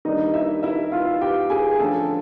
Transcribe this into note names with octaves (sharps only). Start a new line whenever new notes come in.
D#3 G3 A#3 D4 D#4 D#5
E4 E5
E4 E5
F4 F5
G4 G5
G#4 G#5
D3 F3 A3 C#4 A4 A5